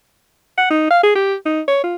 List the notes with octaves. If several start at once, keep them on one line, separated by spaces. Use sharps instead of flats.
F#5
D#4
F5
G#4
G4
D#4
C#5
F4